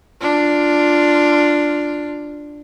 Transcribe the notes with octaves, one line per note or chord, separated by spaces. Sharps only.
D4 F4